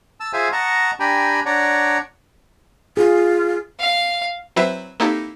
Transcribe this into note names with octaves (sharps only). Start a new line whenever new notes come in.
A5 E6
F4 G#4 C5 E5 F5 G#5
D#5 F#5 A5 A#5 C#6
D4 G4 G5 G#5 A#5 B5
D4 C#5 D5 F#5 A#5
F4 G#4
F5
F#3 C4 E4 B4 C5 E5
A#3 C4 D#4 E4 G4 A4